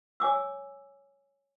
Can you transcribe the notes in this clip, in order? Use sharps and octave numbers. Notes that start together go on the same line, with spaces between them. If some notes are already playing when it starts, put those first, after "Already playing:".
C#5 G#5 D6 E6